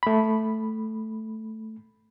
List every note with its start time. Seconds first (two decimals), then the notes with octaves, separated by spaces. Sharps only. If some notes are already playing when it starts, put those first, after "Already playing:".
0.03 A3 B5